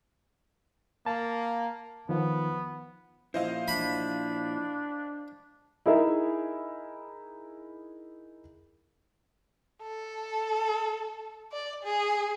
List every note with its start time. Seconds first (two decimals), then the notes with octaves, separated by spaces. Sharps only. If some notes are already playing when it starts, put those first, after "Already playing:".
1.06 A#3 A5
2.09 D#3 F3 B3
3.34 A#2 F3 E4 C5 D#5 F5
3.68 D4 B5
5.86 D#4 E4 G#4 A#4 E5
9.83 A4
11.52 D5
11.84 G#4